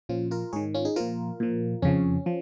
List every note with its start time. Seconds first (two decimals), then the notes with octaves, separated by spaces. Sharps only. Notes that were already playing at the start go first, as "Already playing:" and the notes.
0.09 A#2 F3 C#4 F4
0.31 F4 A#4
0.53 G#2 D#3 G#4 C#5
0.74 C#4 F4
0.85 D#4 G#4
0.96 A#2 F3 F4 A#4
1.40 A#2 F3
1.82 F2 C#3 F3 C#4
2.26 F3